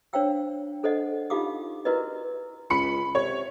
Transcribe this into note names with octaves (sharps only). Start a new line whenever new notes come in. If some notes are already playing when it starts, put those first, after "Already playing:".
D4 C5 C#5 F5 G5 E6
D4 A4 C5 D5 D#5 F#5
D#4 F4 G4 F5 D6 D#6
E4 F#4 A#4 B4 D5 D#5
C#2 B5 C#7
C3 C#5